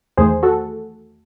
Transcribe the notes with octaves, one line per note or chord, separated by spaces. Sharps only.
E2 D#3 A3 G#4 C5
F#4 A4